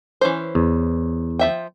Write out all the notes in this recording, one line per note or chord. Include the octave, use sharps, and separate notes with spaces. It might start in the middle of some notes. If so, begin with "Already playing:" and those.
E3 C#4 C5
E2
F3 E5 G5